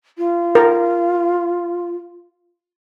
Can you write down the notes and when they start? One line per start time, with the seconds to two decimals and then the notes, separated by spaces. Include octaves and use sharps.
0.18 F4
0.55 A#4